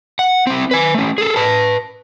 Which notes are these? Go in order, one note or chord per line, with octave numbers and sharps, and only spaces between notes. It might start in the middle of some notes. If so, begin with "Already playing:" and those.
F#5
C4 E4
B4 G#5
A3 C#4
G#4 A4
B4 A5